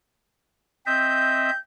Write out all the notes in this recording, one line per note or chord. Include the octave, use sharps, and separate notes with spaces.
C4 D#5 E5 G6